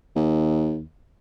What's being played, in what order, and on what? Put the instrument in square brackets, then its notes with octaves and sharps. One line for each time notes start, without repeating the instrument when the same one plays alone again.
[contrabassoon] D#2